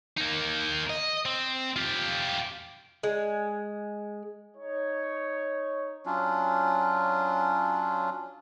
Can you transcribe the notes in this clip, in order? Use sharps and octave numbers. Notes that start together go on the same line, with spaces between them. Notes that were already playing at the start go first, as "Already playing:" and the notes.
A#3 D#4
D#5
C4
F4 G4
G#3
D#4 C#5
F#3 C#4 D4 F4